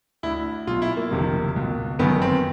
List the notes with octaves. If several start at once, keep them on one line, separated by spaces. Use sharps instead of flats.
D2 D3 E4
B1 B2 F4
E4
A#3
F#1 F2 C3 D#3
C#2 B2
G1 F#2 D#3 B3
C4